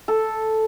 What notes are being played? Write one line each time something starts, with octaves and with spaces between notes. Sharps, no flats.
A4